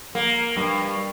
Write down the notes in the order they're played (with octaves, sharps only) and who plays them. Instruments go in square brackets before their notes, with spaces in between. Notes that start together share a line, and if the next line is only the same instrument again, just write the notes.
[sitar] A#3
G2